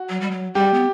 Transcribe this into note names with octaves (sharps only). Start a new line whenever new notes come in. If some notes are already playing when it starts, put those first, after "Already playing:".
Already playing: F#4
F#3
G3
F#3
G3 G4
B3